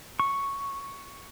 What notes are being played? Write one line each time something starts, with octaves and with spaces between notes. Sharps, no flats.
C#6